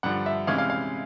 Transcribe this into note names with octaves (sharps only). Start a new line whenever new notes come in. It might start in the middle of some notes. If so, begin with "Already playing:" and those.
G2 D3 F3 F#5
E5
C3 E3 G#3 C#4 F5
F5
F5